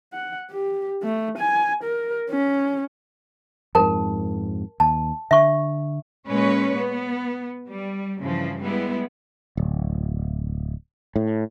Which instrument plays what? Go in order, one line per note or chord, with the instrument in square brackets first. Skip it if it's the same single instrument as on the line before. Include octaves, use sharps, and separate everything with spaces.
[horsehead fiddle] F#5
G4
A3
G#5
A#4
C#4
[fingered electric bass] F2 G#2 [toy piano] A#4 A5
[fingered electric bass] D#2 [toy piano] A5
[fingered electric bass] D3 [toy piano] E5 C#6
[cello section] A#2 G#3 C#4 B4 C#5
B3
G3
G2 C#3 E3 F3
G3 G#3 B3 E4
[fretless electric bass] D1
A2